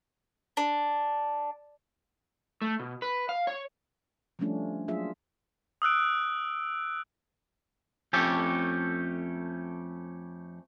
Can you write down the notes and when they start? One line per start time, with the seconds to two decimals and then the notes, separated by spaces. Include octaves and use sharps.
0.57 D4
2.61 A3
2.80 B2
3.02 B4
3.29 F5
3.47 C#5
4.39 F3 G3 A3 C#4 D4 F4
4.88 F#3 A#3 D4 F4 G#4 E5
5.82 D#6 E6 F#6 D7
8.13 F2 A3 C#4 G4 A4